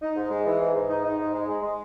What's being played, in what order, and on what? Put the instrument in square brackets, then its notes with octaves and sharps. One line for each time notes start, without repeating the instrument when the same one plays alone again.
[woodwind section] D#4
G#2
G#3
E3
G#2
G#2
D#4
D#4
G#2
G#3
G#3
G#3